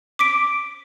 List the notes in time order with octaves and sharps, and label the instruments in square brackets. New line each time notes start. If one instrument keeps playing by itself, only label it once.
[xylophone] D6 B6 D7